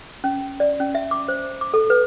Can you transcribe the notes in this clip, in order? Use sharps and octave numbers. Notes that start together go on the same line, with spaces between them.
C#4
D5
C#4
E5
D6
C5
D6
A4
B4